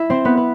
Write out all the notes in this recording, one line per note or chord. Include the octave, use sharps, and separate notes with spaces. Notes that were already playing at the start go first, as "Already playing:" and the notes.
Already playing: E4 E5
C4 C5
B3 B4
B4